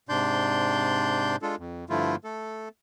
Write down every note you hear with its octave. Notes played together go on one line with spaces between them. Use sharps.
G#2 C3 D4 D5 C6 G6
G#3 D4 F4 A4
F2
G2 D3 F3 A3 E4 F4
A3 A4